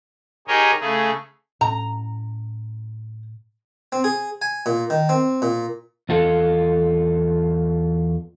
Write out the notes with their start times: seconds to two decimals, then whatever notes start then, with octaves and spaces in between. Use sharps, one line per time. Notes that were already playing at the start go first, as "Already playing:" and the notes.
0.48 D#4 G4 G#4 A#4 C#5 D#5
0.80 C#3 A3 G#4
1.61 A2 C#4 A#5
3.92 C4
4.04 G#4
4.42 G#5
4.66 A#2
4.90 D#3
5.09 C4
5.42 A#2
6.09 E2 F4 A4